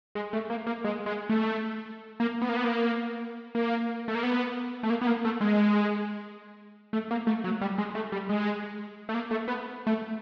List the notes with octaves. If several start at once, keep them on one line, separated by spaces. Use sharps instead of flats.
G#3
A3
A#3
A#3
G#3
G#3
A3
A#3
B3
A#3
B3
A#3
A#3
A3
A#3
B3
A3
A#3
B3
A#3
A3
G#3
A3
A#3
A3
F#3
G3
G#3
A3
G3
G#3
A3
A#3
A3
B3
A3